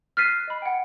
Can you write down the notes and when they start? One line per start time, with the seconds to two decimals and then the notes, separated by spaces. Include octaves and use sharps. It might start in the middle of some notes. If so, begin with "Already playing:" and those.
0.17 F6 F#6 A6 B6 C7 D#7
0.48 D#5 B5
0.62 F#5 G5